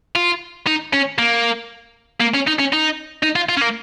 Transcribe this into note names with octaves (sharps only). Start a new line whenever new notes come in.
F4
D#4
C#4
A#3
A#3
C#4
D#4
C#4
D#4
D#4
F4
F4
C#4
A#3